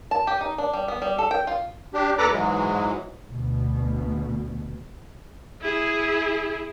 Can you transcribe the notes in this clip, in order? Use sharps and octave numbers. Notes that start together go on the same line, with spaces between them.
A5
G4
D#4
D4
G3
B3
G3
A4
G5
F4
D4 G4
D#2 A4 B4 D5 A#5 D6
G#2 E3 F#3 G#3
D2 B2
E4 G#4